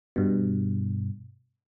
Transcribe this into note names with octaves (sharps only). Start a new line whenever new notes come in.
G2 B2